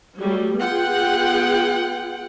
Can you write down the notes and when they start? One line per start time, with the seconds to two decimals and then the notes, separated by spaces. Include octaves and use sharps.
0.19 F#3 G3 A3
0.60 B3 F4 G#4 F#5 G5